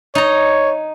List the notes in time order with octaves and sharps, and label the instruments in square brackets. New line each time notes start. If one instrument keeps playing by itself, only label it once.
[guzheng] D#4 A#5 [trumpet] C#5